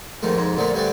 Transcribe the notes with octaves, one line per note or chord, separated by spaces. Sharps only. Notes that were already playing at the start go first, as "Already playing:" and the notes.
F2 G#2 D#3 A3
F2 G#2
F2 A#2 D3 F3 A3
G2 D3 A3 C4 D5